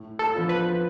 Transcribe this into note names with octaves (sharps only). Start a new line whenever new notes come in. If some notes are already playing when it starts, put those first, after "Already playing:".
Already playing: A2
A4
F3 B3 D4 F4
B4